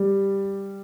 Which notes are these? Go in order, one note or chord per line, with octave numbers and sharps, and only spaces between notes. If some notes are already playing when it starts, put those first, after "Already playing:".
Already playing: G3